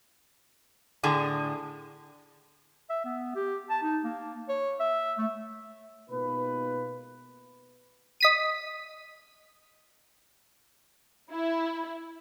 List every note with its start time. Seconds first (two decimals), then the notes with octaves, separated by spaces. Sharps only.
1.03 A2 D3 G#4
2.90 E5
3.05 B3
3.35 G4
3.70 A5
3.83 D#4
4.04 A#3
4.49 C#5
4.80 E5
5.18 A3
6.10 B2 G#3 A#3 D#4 F4 B4
8.21 D#5 B6 D#7
11.31 E4